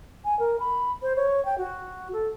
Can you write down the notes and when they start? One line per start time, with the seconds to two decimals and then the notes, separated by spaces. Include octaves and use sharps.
0.25 G#5
0.39 A#4
0.60 B5
1.02 C5
1.16 C#5
1.45 G5
1.58 F#4
2.13 A4